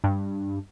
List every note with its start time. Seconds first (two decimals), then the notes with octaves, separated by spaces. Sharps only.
0.04 G2